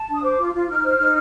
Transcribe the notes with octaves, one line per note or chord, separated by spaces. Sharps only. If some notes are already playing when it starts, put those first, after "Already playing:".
Already playing: A5
D4
D#6
C5 D6
F4
F4
D#4 F6
C5
D#4